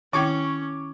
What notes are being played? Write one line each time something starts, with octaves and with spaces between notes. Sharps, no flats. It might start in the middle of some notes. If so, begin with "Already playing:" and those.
D#3 C#4 E4 G5 C#6 D6 G#6